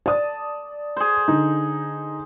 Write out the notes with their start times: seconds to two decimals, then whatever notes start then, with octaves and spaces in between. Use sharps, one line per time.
0.06 D5 A5 D#6
0.97 G#4 C5
1.28 D3 D#4